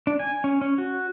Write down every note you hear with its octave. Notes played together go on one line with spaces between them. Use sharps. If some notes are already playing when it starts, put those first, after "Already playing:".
D4
G#5
C#4
C#4
F#4